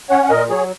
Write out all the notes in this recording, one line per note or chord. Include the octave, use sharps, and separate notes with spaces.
C#4 C#5 F#5
F#5
A#2 A#4 D#5
F#3 G#4 C#5